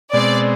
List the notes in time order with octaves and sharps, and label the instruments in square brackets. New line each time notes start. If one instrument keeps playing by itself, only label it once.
[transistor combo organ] B2 G#3 C4 [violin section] D5